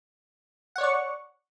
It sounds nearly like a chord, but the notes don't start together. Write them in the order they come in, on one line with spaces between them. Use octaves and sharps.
F#5 C#5 D5 C#6